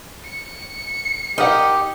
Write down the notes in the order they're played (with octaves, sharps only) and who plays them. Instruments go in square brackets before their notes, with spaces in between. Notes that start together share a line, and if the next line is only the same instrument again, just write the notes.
[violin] C#7
[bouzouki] D#4 [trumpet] G4 [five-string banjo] A#4 F#5